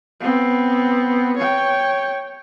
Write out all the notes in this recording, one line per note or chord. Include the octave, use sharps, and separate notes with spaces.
B3 C4
C#5 G5